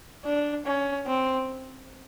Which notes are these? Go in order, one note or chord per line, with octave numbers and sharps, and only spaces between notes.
D4
C#4
C4